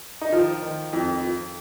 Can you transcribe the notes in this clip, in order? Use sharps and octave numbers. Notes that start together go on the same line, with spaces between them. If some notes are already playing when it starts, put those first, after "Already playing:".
D#4
D#3 F3 F4
D#3
F2
F3